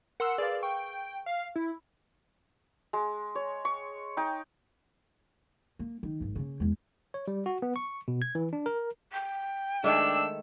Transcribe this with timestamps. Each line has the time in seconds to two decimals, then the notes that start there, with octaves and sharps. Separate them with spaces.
0.20 A#4 F#5 C6 E6
0.38 G#4 B4 D5 F5
0.63 G5 C#6
1.26 F5
1.56 E4
2.93 G#3
3.35 C#5
3.65 C#6
4.17 D#4 G5
5.79 A#3
6.03 D#3
6.20 G#1 G2
6.35 C#3 A#3
6.60 E2 G#3
7.14 C#5
7.28 G3
7.46 F#4
7.62 B3
7.76 C#6
8.08 B2
8.22 G#6
8.35 E3
8.53 D4
8.66 A#4
9.12 G5
9.84 D#3 G#3 A3 D4 E6